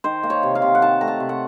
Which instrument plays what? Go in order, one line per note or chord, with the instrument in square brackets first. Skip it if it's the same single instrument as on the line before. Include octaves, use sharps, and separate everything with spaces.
[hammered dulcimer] D#3 C5
A#3
C#5
C3
F5
C3
F#5
D#3 A5
A3 A#5
A5
C3
F#5